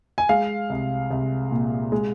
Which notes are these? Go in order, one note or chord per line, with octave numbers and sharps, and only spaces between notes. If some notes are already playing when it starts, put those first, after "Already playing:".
G#5
G#3 F5
C2
C2
A#2
G#3